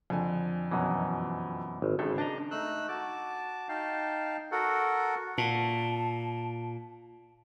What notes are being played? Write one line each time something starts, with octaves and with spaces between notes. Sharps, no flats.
F2 D3 G#5
F#2 B2 E3
G#1
G#1 C#3 A4
D4 D#5 A5 A#5
A3 D#4 E6 F#6
F#4 A5 D6
D#4 F5 G5 A5
F#4 A4 A#4 F#5
A#2 A5